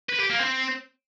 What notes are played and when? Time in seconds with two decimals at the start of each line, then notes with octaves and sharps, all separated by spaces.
0.09 B4
0.19 G4
0.30 A#3
0.40 C4